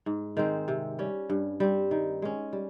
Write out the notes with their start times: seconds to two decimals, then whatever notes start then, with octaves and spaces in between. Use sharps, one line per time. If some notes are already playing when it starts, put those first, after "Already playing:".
0.06 G#2
0.37 D#3 G#3 C4
0.68 C3
0.99 G3 C#4
1.30 G2
1.60 G3 C4
1.91 D#3
2.22 G#3 C#4
2.53 G3